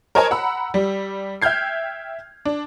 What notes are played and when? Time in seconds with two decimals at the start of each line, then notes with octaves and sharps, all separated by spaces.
0.15 A#4 C5 C#5 D#5 G#5 A5
0.31 F#5 A#5 B5 E6
0.74 G3
1.42 E5 G5 F6 G6 G#6 C7
2.45 D4